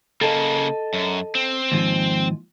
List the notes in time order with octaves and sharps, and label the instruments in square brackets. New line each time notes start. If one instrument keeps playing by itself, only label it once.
[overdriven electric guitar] C#3 A#3 [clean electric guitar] A4 D#5 A5
[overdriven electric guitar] F#2
C4
[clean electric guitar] D#2 G#2 F3